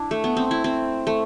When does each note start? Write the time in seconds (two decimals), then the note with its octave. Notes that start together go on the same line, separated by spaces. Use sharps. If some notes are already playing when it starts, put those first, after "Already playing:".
Already playing: D4 E4
0.11 A3
0.24 B3
0.37 C4
0.51 E4
0.64 C4
1.07 A3